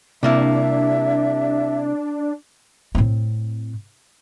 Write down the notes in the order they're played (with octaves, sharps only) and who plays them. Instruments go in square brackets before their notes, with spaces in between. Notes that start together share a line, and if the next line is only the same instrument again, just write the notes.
[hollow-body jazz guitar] C3 [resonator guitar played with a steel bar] G3 A#3 E4 [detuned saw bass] D4 [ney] E5
[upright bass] A2 C4